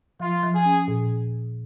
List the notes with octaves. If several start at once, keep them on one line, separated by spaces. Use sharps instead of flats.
F3 F4
F3
G#4
C#4
A#2